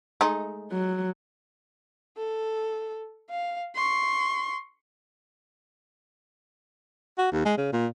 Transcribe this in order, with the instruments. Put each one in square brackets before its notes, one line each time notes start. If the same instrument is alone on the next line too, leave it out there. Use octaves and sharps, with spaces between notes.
[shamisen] G#3 A3 D#4
[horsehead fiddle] F#3
[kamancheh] A4
F5
C6 C#6
[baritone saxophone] F#4
D#2
G#3
C#3
A#2